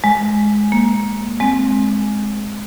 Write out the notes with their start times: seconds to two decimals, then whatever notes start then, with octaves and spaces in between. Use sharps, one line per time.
0.04 G#3
0.72 A#3
1.40 G#3 C4